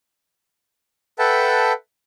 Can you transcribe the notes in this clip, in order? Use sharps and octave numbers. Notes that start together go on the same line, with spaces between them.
A4 B4 E5 F#5 G5 A5